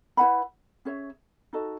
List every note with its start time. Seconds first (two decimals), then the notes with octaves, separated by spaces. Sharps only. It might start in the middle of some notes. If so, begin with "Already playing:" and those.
0.17 E4 B4 F#5 B5
0.85 C#4 G#4 C#5 E5
1.53 D#4 F#4 A4 D#5